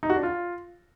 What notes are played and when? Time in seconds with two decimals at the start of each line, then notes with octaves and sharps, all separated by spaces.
0.03 D#4
0.10 F#4
0.16 D4
0.23 F4